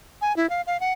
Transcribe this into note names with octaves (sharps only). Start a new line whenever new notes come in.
G#5
E4
F5
F5
F#5